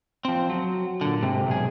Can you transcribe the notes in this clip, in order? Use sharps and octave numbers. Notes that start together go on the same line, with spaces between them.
F3 C4
F#3
A#2 D3
G#2 C3
B1 G#4